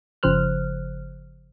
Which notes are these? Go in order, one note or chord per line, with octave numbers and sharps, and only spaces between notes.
G1 C#3 F3 C5 F6 F#6